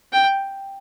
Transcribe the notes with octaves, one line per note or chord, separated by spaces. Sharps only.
G5